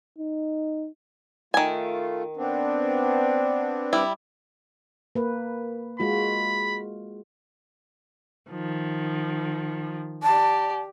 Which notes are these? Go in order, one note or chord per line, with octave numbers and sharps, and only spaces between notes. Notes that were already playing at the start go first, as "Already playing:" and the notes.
D#4
D#3 A3 F4 G#5
B3 C4 D4
G3 E4
A#3 B4
G#3 F4 F#4 B5
D#3 F3
G4 D5 A5